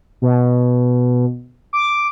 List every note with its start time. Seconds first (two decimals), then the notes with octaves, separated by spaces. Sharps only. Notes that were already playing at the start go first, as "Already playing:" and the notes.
0.22 B2
1.73 D6